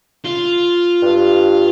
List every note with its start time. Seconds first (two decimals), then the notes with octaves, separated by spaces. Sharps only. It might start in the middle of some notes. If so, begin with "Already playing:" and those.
0.25 F4
1.02 G2